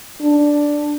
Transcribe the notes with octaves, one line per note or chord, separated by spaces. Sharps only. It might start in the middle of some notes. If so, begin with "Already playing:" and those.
D4